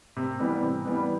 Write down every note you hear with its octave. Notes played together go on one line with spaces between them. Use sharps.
C3
E3 G3 B3
C3
E3 G3 B3